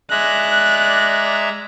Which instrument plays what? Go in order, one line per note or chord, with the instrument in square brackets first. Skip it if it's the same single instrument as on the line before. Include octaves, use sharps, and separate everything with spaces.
[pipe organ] G#3 E5 A#5 [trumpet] D5 [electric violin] F#6